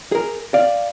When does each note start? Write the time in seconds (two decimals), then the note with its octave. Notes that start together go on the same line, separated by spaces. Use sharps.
0.12 G#4 A#4
0.54 D5 F5